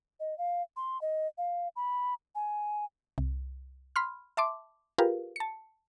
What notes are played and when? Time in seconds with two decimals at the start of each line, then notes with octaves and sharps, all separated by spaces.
0.20 D#5
0.38 F5
0.77 C6
1.02 D#5
1.38 F5
1.76 B5
2.35 G#5
3.18 C2
3.96 B5 C6 F6
4.37 E5 A5 C6 D6
4.98 F4 G4 G#4 A#4 B4 F5
5.36 A5 C#7